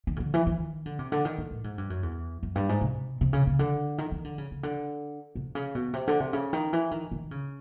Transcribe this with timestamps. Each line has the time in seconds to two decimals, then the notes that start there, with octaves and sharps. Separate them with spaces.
0.07 D#3
0.16 C#3
0.20 D3
0.34 E3
0.47 D#3
0.86 D3
0.99 C3
1.12 D3
1.25 D#3
1.38 A2
1.51 A2
1.64 G#2
1.78 G2
1.90 F#2
2.03 E2
2.43 F#2
2.55 G2
2.69 G#2
2.81 C3
3.21 C3
3.33 C#3
3.47 C#3
3.59 D3
3.98 D#3
4.12 D#3
4.24 D3
4.38 C#3
4.51 C#3
4.63 D3
5.35 C3
5.55 C#3
5.75 B2
5.93 C3
6.07 D3
6.20 C3
6.33 C#3
6.53 D#3
6.73 E3
6.91 D#3
7.12 D#3
7.31 C#3